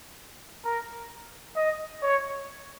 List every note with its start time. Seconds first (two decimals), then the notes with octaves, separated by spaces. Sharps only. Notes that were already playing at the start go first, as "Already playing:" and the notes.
0.65 A#4
1.56 D#5
2.02 C#5